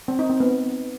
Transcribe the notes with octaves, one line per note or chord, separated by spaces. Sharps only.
C4
D#4
C4
B3